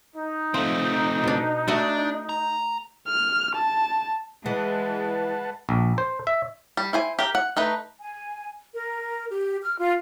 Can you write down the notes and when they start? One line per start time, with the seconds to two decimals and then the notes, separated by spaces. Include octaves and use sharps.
0.16 D#4
0.54 F3 A3 C4
1.24 B2 D4
1.68 A3 D4 F#4 D#5
2.29 A#5
3.08 F6
3.55 A5
4.46 E3 G#3 B4 F#5 A5
5.69 A#1
5.98 C5
6.27 E5
6.77 G3
6.93 E4 C5 G#5
7.19 G4 A#4 G5
7.35 F#5
7.57 A3 D#4 B4
8.00 G#5
8.73 A#4
9.30 G4
9.62 F6
9.77 F4